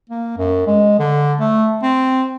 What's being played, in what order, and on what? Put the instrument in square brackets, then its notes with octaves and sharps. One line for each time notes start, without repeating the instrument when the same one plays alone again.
[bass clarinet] A#3
F#2
G#3
D3
A3
C4